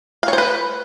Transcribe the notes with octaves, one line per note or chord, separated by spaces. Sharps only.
F5
C#5
C5
B4